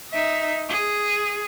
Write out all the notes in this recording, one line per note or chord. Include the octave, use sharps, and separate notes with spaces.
D#4 E5
G#4